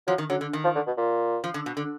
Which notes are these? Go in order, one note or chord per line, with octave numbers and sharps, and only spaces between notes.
F3 F#3
D#3
D3 F#3
D3
D#3
F3
D3
B2
A#2
F3
D3
B2
D3